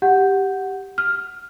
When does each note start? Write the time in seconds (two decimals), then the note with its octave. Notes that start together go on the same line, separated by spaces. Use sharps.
0.02 G4 F#5 G6
0.98 F6